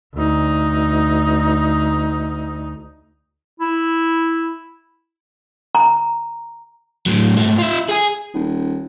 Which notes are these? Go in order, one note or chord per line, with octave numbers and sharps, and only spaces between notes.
D2 D#4
E4
A#5
A2 F#3
G#2 A3
F4 E5
G#4 G#5
D#1